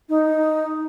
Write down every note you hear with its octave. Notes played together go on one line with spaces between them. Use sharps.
D#4